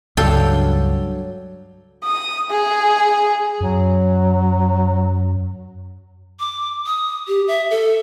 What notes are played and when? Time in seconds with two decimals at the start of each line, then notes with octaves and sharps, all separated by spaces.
0.17 C#2 G2 F#3 D4 A4 F5 G5
2.04 D#6
2.50 G#4
3.60 F#2 F#3
6.40 D6
6.86 D#6
7.28 G4
7.48 E5
7.71 A4